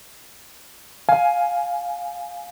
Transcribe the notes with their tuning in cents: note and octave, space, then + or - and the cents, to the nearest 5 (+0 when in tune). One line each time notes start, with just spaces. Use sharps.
F5 +10 G#5 +10